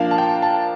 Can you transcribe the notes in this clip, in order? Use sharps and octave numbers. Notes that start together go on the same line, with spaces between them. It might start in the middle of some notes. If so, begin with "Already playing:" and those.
Already playing: F3 A#3 D4 F5
A5
G5
A5